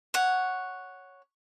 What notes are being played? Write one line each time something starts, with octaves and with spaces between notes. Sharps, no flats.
C#5 F#5